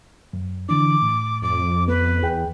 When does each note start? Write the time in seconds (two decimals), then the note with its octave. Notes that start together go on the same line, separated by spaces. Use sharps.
0.33 F#2
0.69 D3 E3 D4 D6
1.02 A2
1.42 F2 D6
1.88 B3 B4
2.23 E2 G#4 G5